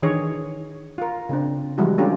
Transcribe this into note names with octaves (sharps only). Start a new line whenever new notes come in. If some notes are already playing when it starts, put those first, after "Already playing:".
D#3 E3 D4 G#4 C#5
F4 A#4
C#3 C4 D4
E3 F3 G3 G#3 E4 F#4
G#3 A3 C#4 D4 F4 G4